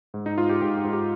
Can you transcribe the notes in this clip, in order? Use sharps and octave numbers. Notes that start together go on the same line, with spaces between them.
G#2
D#4
G#2 F4
G4
G#2 G4
G4
G#2
G4